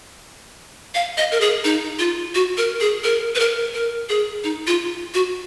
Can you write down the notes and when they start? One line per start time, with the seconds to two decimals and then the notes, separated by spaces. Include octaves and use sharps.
0.94 F5
1.18 D#5
1.32 A#4
1.41 G#4
1.64 D#4
1.99 F4
2.35 F#4
2.57 A#4
2.80 G#4
3.04 A#4
3.35 B4
3.40 A#4
3.74 A#4
4.09 G#4
4.44 D#4
4.67 F4
5.14 F#4